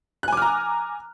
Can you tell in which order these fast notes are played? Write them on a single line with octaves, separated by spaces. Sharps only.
F#6 G#5 D6 F6 A#5